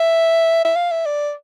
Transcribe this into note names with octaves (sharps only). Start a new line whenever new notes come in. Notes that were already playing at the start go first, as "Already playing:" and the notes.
Already playing: E5
E5
F5
E5
D5